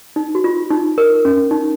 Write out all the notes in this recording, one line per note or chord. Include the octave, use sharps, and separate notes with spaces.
D#4
F#4
F4
D#4
A#4
C#4
D#4